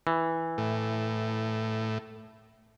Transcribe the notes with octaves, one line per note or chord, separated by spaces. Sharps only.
E3
A2